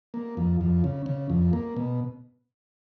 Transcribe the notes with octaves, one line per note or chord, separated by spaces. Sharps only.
A#3
F2
F2
C#3
C#3
F2
A#3
B2